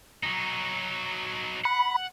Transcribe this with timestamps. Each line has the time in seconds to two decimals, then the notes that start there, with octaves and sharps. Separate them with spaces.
0.23 F#3 D#4
1.65 F#5 B5